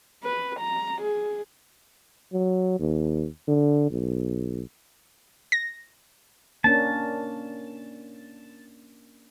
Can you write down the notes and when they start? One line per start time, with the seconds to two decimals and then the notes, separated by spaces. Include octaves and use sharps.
0.24 B4
0.60 A#5
1.01 G#4
2.33 F#3
2.79 D#2
3.48 D3
3.91 B1
5.52 A#6
6.64 A#3 C#4 D4 A5